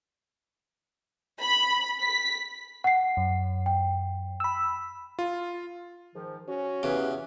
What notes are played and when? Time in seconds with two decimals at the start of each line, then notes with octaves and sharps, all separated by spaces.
1.41 B5
2.00 B6
2.84 F#5 C7
3.17 F#2
3.66 G5
4.40 B5 E6
5.19 F4
6.15 G#2 D#3 F3
6.48 C#4 F#4
6.83 E2 C#3 F#4 G4 B4